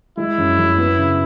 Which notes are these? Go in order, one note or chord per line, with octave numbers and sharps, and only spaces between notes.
G#3 E4
F#2
F#2
B3
C#3